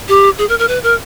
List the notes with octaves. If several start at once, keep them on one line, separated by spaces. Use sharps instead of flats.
G4
G#4
A#4
A#4
B4
A#4